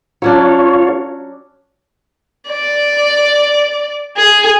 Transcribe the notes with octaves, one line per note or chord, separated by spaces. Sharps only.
F#3 C#4 D4 F4 C#5
D5
G#4